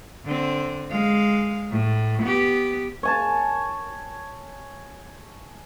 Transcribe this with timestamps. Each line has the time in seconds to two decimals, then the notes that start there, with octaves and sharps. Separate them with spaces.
0.25 D3 C4
0.90 G#3 F5
1.71 A2
2.22 B3 G4
3.03 C#5 G#5 A5